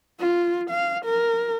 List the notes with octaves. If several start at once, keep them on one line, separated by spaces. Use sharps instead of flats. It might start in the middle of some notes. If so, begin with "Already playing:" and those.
F4
F5
A#4